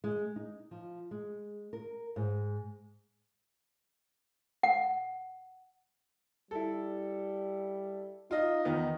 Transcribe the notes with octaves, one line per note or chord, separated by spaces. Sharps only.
G#3
D#4
F3
G#3
A#4
G#2
F#5
G3 E4 A4
D#4 F4 D#5
E2 D#3 B3 D#4